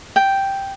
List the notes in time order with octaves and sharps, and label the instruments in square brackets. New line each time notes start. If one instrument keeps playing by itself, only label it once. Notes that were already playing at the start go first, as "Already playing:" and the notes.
[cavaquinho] G5